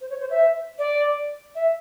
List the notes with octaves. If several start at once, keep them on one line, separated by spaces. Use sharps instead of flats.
C5
C#5
C5
E5
D5
E5